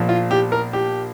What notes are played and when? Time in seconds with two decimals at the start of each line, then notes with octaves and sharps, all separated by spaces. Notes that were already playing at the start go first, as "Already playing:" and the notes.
Already playing: A#1 A#2 F3
0.09 F4
0.31 G4
0.52 A#4
0.73 G4